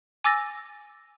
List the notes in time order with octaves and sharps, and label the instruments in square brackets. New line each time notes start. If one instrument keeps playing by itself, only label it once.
[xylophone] G#5 D6 E6 A6 A#6